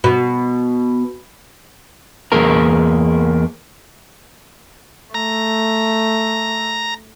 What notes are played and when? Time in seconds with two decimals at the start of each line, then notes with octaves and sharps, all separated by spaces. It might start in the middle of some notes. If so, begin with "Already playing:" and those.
0.04 B2
2.32 E2 A#3 G#4 A#4 A#5
5.14 A3 A#5